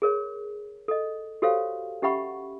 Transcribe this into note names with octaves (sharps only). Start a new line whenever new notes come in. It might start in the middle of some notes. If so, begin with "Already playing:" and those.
G#4 A#4 C#5
A4 D#5
F#4 G4 A4 C5 C#5 F5
C#4 G4 E5 F#5 B5 C#6